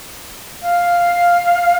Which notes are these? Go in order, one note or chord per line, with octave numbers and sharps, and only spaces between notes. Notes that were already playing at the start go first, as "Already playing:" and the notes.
F5